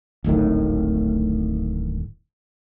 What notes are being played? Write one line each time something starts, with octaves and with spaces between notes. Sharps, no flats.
D1 G#1 A2 D#3